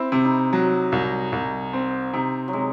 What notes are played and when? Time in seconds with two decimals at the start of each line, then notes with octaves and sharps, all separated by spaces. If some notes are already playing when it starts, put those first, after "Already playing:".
Already playing: C4 E4
0.12 C3
0.25 D#4
0.53 F#3
0.92 C2
1.32 C2
1.73 C4
2.13 C3 D#4
2.48 F#3
2.53 C3 G#3